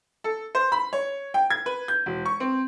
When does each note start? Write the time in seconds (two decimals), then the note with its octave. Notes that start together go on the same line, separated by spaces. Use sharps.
0.24 A4
0.55 C5
0.72 B5
0.93 C#5
1.34 G5
1.50 G#6
1.66 B4
1.88 G6
2.06 E1
2.26 C#6
2.40 C4